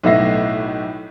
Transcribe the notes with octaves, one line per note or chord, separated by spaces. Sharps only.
B1 A2 B3 E5 A#6 C7